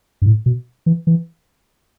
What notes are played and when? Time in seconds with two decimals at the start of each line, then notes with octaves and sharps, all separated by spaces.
0.22 G2
0.26 A2
0.46 B2
0.86 E3
1.07 E3